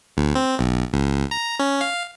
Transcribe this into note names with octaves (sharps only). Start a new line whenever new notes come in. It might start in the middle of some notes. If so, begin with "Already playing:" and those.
D2
C4
B1
C#2
A#5
C#4
F5